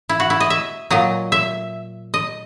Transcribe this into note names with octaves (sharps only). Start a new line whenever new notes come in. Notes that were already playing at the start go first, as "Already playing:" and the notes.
E4
F#4
E4
D#5
E5
A#2 F#3 D#5
E5
D#5